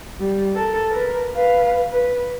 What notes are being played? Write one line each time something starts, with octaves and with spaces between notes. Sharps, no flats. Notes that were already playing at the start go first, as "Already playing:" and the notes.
G3
A4 A#4
A#4 B4
B4 F5
B4